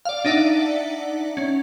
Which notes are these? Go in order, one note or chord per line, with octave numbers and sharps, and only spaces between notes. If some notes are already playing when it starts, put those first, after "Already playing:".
D5 F5
D4 D#4 D5 E5 F#5
C#4